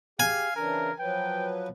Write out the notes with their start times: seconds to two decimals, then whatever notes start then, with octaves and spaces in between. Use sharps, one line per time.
0.20 G4 G#4 F5 G#5
0.56 C#3 E3 D4 A#4
1.00 F3 F#3 B4 G5